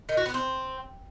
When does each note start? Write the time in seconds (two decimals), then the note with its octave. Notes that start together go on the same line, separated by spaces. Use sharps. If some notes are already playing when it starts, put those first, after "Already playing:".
0.09 D#3
0.17 F#4
0.26 B3
0.34 C4